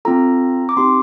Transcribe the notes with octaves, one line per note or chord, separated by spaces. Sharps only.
C4 F4 A4 A#5
D6
C4 D#4 G4 C6